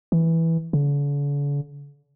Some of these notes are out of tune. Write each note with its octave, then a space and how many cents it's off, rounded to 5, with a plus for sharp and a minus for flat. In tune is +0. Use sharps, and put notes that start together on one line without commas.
E3 -5
D3 -45